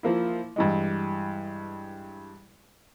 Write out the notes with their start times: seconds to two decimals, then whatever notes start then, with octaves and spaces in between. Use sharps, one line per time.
0.03 F3 A#3 E4
0.56 G2 E3 G#3